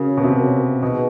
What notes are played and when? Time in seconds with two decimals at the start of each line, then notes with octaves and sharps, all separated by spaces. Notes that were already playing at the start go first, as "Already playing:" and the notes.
Already playing: C#3 C#4 F#4 A#4 C#5
0.17 B2
0.24 C3
0.82 B2 D#4 G#4 B4 D#5